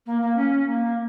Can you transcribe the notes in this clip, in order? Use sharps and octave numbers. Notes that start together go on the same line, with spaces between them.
A#3
A#3
C#4
A#3